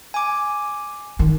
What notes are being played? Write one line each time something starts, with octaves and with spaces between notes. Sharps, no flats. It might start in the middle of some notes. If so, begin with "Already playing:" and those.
G#5 D6
D#3